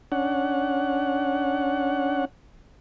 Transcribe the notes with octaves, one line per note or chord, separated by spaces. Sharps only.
C#4 D4 F#5